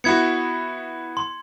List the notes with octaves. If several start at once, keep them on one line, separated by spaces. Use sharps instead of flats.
B3 E4 F#4 G#6 C#7
C6